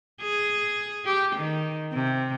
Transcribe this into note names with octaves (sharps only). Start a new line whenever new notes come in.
G#4
G4
D#3
C3